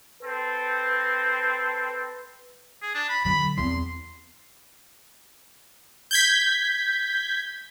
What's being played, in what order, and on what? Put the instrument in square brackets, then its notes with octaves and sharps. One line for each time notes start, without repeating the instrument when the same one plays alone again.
[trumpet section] C4 A4 [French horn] B4
[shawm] G#4
D4
B5
[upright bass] D3 F#3 [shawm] B5
[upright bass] E2 C4 [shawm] C6
[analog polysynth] G6 G#6 B6